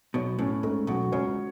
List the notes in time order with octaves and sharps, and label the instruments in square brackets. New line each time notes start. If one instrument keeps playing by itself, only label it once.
[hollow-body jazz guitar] B1 B2 [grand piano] C#5
[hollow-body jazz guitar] A2 [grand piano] C#4
[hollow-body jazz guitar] G#2 [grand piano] A3
[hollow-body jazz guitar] B1 B2 [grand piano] F#4
[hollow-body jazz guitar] C#2 C#3 [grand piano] C#5